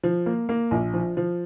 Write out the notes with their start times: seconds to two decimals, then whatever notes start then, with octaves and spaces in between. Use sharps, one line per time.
0.03 F3
0.26 A#3
0.49 A#3
0.71 A#1
0.94 F3
1.17 F3